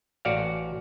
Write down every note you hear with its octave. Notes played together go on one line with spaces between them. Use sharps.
A1 F#4 D5 F5